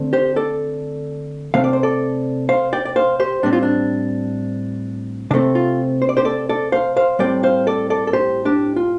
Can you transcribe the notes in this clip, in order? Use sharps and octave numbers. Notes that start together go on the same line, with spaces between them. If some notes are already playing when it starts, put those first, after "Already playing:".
Already playing: D3 A3 C4
G4 C5
A4 D5
C3 A3 C4 F5
D5
C5
A4 D5
C5 F5
D5 G5
D5
C5 F5
G4 C5
A2 G3 C4 D4
F4
D4
C3 A3 C4 D4
F4
C5
D5
G4 C5
A4 D5
A4 D5
C5 F5
C5 F5
A2 G3 C4 D5 G5
C5 F5
A4 D5
A4 D5
A4
G4 C5
D4 G4
F4